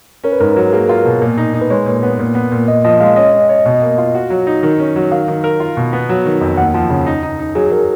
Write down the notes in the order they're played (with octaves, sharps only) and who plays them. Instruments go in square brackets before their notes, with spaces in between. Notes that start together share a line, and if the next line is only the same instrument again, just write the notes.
[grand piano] C#4 [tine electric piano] A#4
[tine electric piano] B4
[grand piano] G#2 [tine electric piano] A#4
[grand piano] F#3
[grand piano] A#3 [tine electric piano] G#4
[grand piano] F4
[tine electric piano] A#4
[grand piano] B2
A#2
D#4
D#4
[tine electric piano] B4
[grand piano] G#3 [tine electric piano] C#5
[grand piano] A#2
B3
A#2
B3
A#2
[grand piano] A#2 [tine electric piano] D#5
[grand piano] F3 [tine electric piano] D#5
[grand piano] G#3 [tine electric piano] F5
[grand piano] C#4 [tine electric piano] D#5
[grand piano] C#4
C#5
B2
A#3
F4
F#4
F#3
D#4
D#3
C#4
F#3
[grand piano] D#3 [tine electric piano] F5
[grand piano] D#3
A#4
F4
B2
B3
F#3
D#3
F2
[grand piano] D#2 [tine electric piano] F#5
[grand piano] F3
C#3
D#4
D#4
D#4
[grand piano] F#3 [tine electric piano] G#4
[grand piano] F#3 [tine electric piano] A#4